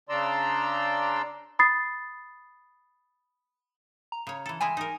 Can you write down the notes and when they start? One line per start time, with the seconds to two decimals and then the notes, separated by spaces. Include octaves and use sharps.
0.09 C#3 D4 D5 A#5 C6 E6
1.59 B5 D#6 A6 C7
4.12 A#5
4.27 C#3 C#5
4.46 E3 A4
4.61 G3 G#3 E4 G#5
4.77 D#4 A#4